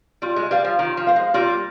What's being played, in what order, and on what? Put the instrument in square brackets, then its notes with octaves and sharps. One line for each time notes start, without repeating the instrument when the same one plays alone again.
[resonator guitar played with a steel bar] G3 [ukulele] F4
[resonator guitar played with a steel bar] G#3
[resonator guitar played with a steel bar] G3 [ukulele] C5 F5
[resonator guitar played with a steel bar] F3
[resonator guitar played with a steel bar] D#3 [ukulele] F4
[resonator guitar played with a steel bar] F3
[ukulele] C5 F5
[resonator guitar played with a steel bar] G#3
[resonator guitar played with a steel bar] G3 A#3 [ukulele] F4